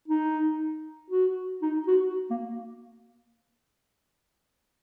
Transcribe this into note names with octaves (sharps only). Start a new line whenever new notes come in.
D#4
F#4
D#4
F#4
A#3